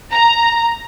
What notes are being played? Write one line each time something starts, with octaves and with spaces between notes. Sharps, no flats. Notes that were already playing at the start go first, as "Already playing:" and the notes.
A#5